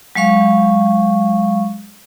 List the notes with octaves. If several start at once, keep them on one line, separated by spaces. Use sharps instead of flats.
F#3 G#3 F5 C#6